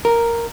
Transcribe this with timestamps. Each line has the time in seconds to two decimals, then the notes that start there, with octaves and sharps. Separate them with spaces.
0.05 A#4